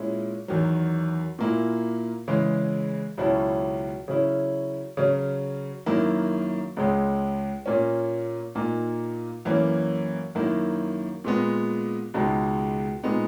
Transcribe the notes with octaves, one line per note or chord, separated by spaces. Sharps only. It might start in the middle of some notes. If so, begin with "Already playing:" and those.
Already playing: A#2 G#3 C#4 E4
E2 D#3 F#3
A#2 A#3 E4
C#3 E3 G#3
C#2 B2 F#3 C#4 E4
C#3 F#3 C#4 E4
C#3 F#3 C#4
F#2 D#3 A#3 E4
C#2 C#3 G#3
A#2 A#3 C#4
A#2 A#3 D#4
F#2 E3 A#3 C#4
F#2 D#3 A#3 E4
A#2 G#3 B3
C#2 B2 G#3 D#4
A#2 G#3 B3 D#4